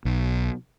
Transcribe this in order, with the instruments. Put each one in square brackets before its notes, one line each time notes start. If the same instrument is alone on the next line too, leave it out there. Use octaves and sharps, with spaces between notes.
[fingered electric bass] B1